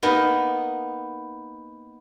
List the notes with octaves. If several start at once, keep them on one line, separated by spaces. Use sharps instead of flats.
A#3 B3 D#4